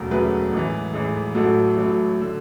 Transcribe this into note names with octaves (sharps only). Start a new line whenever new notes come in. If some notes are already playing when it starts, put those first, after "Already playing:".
Already playing: E1 D2 C#3 F#3
E1 D2 C#3 F#3 G#4 B4
A1 G#2 E3
A1 G#2 E3
A1 A2 F#3 F#4 A4
A1 A2 F#3
D3